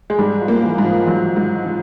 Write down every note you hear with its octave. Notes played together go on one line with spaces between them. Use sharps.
G#3
G#2 G3
F3
A#3
E3
G#2
F3
G#2 F#3
G#2
F3